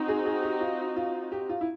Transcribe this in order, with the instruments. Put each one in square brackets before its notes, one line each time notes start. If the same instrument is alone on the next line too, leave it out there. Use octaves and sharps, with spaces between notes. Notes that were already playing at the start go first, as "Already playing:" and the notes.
Already playing: [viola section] C4 D#4 F#4
[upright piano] G#4
G#4
G4
F4
F4
G4
F4
E4